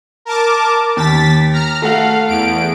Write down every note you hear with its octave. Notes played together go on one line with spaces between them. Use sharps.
A#4 A5 D6
D#2 A6 B6
A#5 F6
A3 F5 F#5
E2 D7